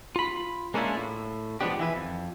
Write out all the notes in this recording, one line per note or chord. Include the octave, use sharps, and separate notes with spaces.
F4 B5
G#3 A#3 C#4 D4 E4 F4
A2
F3 G#3 B3 C4 D4 G4
E3 E4 B4
F2